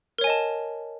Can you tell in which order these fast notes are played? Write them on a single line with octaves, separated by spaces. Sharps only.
A#4 C#5 G#5 D#5 A5